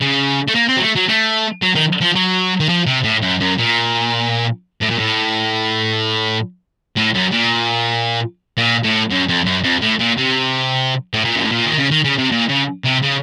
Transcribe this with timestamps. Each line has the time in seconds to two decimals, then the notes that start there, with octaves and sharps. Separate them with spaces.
0.01 C#3
0.48 A3
0.55 A#3
0.68 C4
0.77 F#3
0.82 A3
0.95 F#3
1.08 A3
1.62 F#3
1.75 D#3
2.01 F3
2.15 F#3
2.60 D#3
2.69 F3
2.87 C3
3.04 A2
3.22 F#2
3.40 F#2
3.58 A#2
4.82 A2
4.91 A#2
4.99 A2
6.97 A2
7.15 F#2
7.32 A#2
8.57 A#2
8.84 A2
9.10 F#2
9.28 F2
9.46 F#2
9.64 F2
9.82 A2
10.00 A#2
10.18 C3
11.14 A2
11.24 A#2
11.36 F#2
11.44 A2
11.51 A#2
11.66 D#3
11.78 C#3
11.91 D#3
12.05 C#3
12.18 C3
12.32 A#2
12.49 C#3
12.85 C3
13.03 C#3